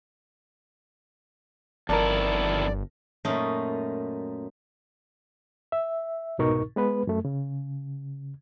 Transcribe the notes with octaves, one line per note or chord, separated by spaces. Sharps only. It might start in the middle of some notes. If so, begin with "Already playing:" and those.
G1 F2 D#3 E4 A#4 D5 A5
F#2 A#2 A3 C#4 D#4
E5
C2 G#2 B2 D#4 A#4 C#6
G#3 B3 B4
F#2 A3
C#3